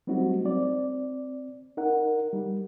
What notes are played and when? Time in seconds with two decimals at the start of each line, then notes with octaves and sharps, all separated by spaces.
0.07 F#3 G3 A3 C4 D#4 F#4
0.45 C4 D5
1.77 D#4 A#4 F#5
2.33 G3